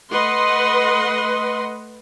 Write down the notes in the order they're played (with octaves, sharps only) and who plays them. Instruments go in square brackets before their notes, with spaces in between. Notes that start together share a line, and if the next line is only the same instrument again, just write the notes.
[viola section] A3 B4 D#5 F#5 C6